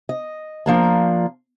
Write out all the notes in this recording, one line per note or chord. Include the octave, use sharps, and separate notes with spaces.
D#5
F3 A#3 D4